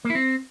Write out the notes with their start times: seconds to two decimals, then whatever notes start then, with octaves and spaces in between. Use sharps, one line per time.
0.05 A#3
0.10 E4
0.15 C4